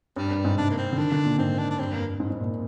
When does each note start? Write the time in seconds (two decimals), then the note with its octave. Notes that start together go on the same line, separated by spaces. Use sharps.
0.16 G2 G3
0.31 G2
0.44 G#2
0.57 C3 D4
0.71 A#3
0.78 C4
0.93 D3
0.98 D#3 D4
1.12 D3
1.25 A#2
1.38 G#2 C4
1.58 D4
1.71 D4
1.79 G2 C4
1.93 F2 A#3
2.20 G#2
2.30 G#2
2.40 A#2